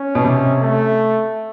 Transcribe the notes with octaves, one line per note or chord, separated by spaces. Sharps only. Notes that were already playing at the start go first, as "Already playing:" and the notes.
Already playing: C#4
B2
C3
A3